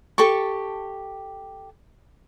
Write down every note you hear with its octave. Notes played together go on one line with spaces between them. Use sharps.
G4 A4 A5 C#6